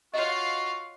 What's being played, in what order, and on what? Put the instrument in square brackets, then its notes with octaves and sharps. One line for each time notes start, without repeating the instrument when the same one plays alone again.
[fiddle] F4 F5 [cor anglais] F#4 [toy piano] C#5 D#5